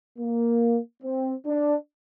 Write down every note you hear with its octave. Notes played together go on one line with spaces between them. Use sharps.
A#3
C4
D4